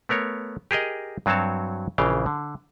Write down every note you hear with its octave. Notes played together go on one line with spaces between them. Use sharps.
A3 B3 A#4 C#5
G4 G#4 A#4 D#5
G2 F#3 C4 F#4 C#5 A5
A#1 C#3 E3 F5 G5
D3